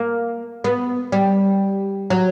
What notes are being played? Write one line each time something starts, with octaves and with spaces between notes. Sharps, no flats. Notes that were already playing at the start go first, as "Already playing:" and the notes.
Already playing: A#3
B3
G3
F#3